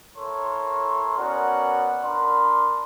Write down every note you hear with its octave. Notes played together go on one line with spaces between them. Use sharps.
E4 A4 A#4 C#5 C6
B3 C#4 F#4 A#4 D5 F#5
D4 A#4 D5 B5 C6